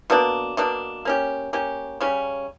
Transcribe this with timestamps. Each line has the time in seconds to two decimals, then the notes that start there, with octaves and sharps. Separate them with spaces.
0.10 B2 A#3 D4
0.57 B2 A#3 D4
1.05 A#3 C#4 G4
1.53 A#3 C#4 G4
2.00 C#3 G3 C#4